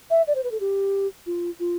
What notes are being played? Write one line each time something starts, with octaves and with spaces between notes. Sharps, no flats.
E5
D5
C5
B4
A4
G4
F4
F4